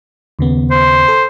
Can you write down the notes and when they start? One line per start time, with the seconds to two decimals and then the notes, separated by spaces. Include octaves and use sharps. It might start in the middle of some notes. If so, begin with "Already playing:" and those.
0.39 D#2 C#3 B3
0.71 C5
1.08 A4